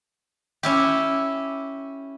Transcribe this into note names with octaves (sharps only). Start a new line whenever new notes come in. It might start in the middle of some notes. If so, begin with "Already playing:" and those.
C#4 E4 G4